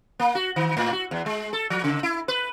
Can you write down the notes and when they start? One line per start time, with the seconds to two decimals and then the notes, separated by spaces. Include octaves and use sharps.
0.20 A#3
0.35 F#4
0.56 D#3
0.77 A2
0.93 F#4
1.11 E2
1.26 G#3
1.53 A4
1.70 F3
1.84 C#3
2.03 E4
2.28 B4